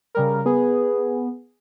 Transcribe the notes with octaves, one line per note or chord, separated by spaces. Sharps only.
C#3 G3 A#4
B3 G#4